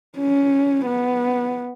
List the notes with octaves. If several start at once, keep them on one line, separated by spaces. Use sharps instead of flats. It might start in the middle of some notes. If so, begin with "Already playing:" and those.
C#4
B3